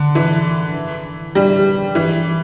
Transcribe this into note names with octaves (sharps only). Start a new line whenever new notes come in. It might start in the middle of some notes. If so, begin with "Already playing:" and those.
Already playing: D3
E3
G3
E3